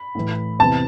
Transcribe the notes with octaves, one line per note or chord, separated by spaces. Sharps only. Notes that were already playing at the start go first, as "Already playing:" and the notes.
Already playing: B5
A2 E3
E2 C3 E3 A5